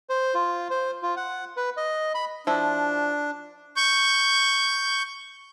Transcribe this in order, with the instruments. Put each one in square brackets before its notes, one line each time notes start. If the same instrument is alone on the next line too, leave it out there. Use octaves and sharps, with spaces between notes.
[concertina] C5
F4
C5
F4
F#5
B4
D#5
B5
[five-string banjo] F3 E4 [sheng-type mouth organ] D4
[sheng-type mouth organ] C#6 G6